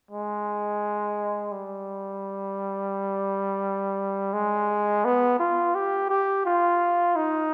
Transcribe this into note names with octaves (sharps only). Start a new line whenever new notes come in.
G#3
G3
G#3
B3
F4
G4
G4
F4
D#4